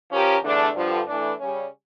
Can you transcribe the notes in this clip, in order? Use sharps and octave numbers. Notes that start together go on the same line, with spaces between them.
F3 C#4 G4 A#4
E2 D3 A3 D4
G2 D3 F3
E3 A3 D4
C#3 G3 C#4